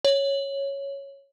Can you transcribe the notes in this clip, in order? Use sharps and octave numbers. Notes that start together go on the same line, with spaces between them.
C#5